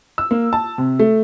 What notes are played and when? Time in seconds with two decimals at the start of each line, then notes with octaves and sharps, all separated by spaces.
0.18 E6
0.31 A#3
0.53 A5
0.78 C3
0.99 A3